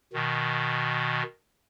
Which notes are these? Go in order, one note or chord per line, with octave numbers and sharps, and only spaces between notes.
B2 D#3